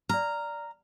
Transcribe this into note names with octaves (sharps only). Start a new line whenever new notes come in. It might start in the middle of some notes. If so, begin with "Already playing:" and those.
D5 A#5 F6